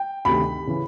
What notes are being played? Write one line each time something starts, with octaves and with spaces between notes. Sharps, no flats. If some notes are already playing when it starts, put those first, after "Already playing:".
Already playing: G5
D2 C3 D#3 B5
C#3 E3